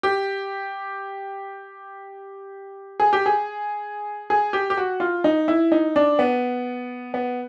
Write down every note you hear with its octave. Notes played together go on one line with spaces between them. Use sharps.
G4
G#4
G4
G#4
G#4
G4
G4
F#4
F4
D#4
E4
D#4
D4
B3
B3